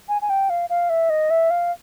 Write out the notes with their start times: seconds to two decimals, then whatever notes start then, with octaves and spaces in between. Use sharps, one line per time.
0.09 G#5
0.22 G#5
0.30 G5
0.50 F5
0.70 F5
0.89 E5
1.10 D#5
1.30 E5
1.50 F5